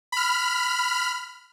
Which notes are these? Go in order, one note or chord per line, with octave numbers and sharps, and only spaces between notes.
B5 F6